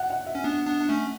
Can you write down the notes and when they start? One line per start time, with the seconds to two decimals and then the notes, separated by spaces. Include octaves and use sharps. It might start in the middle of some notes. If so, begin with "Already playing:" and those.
Already playing: F#5
0.10 F#5
0.26 E5
0.35 C#4
0.44 B3 D4
0.67 B3 D4
0.81 D4
0.89 A3 C#4